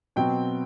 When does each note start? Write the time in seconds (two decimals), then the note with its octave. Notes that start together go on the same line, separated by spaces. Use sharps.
0.16 B2 F#3 C4 G5